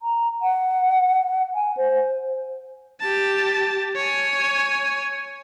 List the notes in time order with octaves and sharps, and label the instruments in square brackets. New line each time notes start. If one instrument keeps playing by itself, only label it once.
[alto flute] A#5
F#5
G#5
C5
[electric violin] G4 A5
C#5 G#5